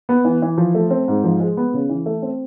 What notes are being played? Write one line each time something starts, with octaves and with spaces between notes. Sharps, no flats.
B3
E3
E3
F3
A3
C4
G#2
F3
G#3
B3
C#3
E3
A3
C4